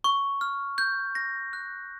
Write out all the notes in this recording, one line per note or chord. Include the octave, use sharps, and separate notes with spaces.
C#6
F6
G6
A#6
F#6